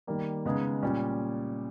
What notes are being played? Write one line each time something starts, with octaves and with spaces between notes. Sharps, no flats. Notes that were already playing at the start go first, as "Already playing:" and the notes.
D#3 G3 A#3
C#3 G#3 B3 D#4 G#4
A#2 G3 C#4